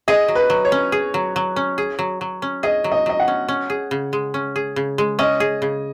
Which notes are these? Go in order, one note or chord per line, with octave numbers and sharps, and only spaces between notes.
G#4 D#5
F#3
B4
F#3
C#5
C#4
G#4
F#3
F#3
C#4
G#4
F#3
F#3
C#4
G#4 D#5
F#3
D#5
F#3 D#5
F#5
C#4
C#4
G#4
C#3
G#3
C#4
G#4
C#3
G#3
C#4 D#5
G#4
C#3